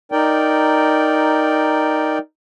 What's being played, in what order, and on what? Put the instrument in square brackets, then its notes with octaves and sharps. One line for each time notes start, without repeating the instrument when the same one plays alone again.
[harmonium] D#4 A#4 D5 G5